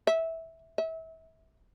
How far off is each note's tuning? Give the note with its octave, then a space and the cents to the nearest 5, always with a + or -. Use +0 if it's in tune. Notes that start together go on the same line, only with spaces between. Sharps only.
E5 -15
E5 -30